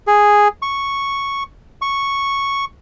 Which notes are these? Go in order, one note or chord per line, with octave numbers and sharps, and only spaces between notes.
G#4
C#6
C#6